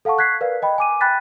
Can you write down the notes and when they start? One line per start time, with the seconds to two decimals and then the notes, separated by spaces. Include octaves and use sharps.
0.05 A4 F5 F#5 A5 C#6
0.18 C#6 F#6 G#6 B6 C7
0.41 A#4 B4 D5 F5
0.62 D#5 G5 B5
0.78 G#5 D6 D#7
1.01 G5 B5 F#6 A6 B6